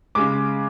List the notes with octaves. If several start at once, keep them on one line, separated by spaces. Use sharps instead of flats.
C#3 G#3 D6